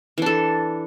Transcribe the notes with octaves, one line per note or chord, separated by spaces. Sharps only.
E3 D4 A4